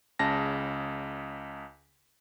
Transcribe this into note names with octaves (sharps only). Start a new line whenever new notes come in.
C#2 C#3 A5 A#6